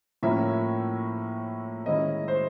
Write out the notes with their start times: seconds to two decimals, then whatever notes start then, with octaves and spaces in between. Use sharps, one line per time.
0.23 A2 F3 A#3 C#4 E5
1.86 D#3 G#3 C#4 E4 D#5
2.28 C5